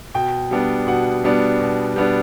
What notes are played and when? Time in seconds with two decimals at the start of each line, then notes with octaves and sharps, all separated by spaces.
0.14 B2 G5
0.51 G3 B3 D4
0.87 B2 F#5
1.24 G3 B3 D4
1.60 B2
1.96 G3 B3 D4